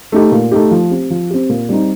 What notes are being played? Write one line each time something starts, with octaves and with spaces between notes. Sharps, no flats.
A3 D#4 G4
A#2
A3 D#4 G4
F3
C4 G4
F3
C4 G4
A#2
G3 C4 D#4